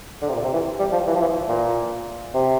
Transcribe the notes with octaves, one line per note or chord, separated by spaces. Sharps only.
D3
C3
A#2
C3
E3
G3
F3
E3
F3
E3
A#2
C3